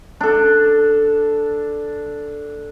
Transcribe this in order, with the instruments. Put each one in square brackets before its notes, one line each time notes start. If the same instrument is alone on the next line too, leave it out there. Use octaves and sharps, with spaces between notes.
[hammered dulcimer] D4 A4